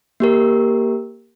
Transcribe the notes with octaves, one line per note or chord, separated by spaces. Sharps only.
A#3 G4 A#4